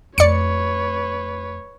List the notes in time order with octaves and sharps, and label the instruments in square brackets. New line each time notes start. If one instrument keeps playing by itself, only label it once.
[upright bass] F2 A3 [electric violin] B4 C#5 [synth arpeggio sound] D5 C#7